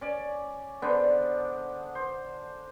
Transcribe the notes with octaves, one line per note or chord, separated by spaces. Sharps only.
C#4 D5
D3 B3 D4 C5
C5